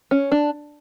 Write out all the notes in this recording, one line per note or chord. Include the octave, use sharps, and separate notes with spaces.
C#4
D4